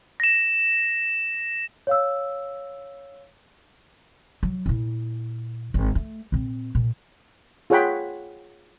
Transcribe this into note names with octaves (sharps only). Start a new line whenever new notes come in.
A#6 E7
C#5 F5 E6
F#3
A#2 E4
G#1
A3
A#2 C4
A#2
F4 G#4 C#5 F#5 G5 B5